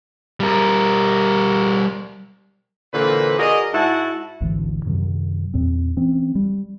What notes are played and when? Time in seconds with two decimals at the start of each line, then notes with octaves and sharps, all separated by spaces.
0.40 G3 A#4
2.94 A#2 D3 E3 A#3 B4 C5
3.38 F#4 G#4 A#4 D5 D#5
3.74 G#2 E4 F#4 F#5 A5
4.41 G#1 D2 E3
4.86 F#2 C3 D#3 F#3
5.54 E2 A#2 C4
5.97 E3 C4 C#4
6.35 G3